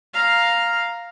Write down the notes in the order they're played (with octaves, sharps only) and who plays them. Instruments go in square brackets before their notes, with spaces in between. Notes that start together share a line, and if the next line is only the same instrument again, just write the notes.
[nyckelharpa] F5 A#5